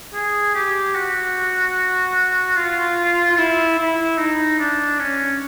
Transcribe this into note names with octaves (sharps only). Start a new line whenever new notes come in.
G#4
G4
F#4
F4
F4
E4
E4
D#4
D4
C#4